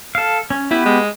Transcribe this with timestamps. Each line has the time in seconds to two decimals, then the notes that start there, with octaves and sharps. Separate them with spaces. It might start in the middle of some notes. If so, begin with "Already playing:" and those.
0.15 A4 F5
0.50 C#4
0.71 B3 E4 G4 B4
0.85 G#3